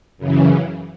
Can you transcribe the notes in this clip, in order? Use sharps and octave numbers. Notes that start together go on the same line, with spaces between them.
F#2 C#3 E3